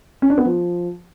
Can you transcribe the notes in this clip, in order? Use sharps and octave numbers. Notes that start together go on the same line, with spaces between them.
C#4
D4
B3
F3